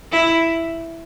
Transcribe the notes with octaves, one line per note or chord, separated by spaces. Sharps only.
E4